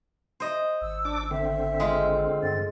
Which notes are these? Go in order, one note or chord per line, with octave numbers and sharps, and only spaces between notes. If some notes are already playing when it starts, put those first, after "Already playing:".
C5 D#5
G#1 E6
D4 D6
D3 C4 E5
G#3 F4
G2 A6